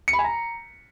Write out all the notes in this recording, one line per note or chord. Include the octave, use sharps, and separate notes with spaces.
C#7
B5
G#5
A#5